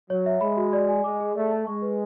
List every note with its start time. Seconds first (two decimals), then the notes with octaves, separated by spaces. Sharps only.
0.10 F#3 C#5
0.26 E5
0.41 G#3 B5
0.57 F#4
0.73 D5
0.88 G#5
1.04 G#3 D6
1.20 G#4
1.35 A3 D5
1.51 A5
1.67 G#3 C#6
1.82 B4